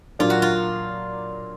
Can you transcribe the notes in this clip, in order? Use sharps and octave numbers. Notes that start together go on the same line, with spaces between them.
A#2 F#3 A#3 D4 F4
F#4
F4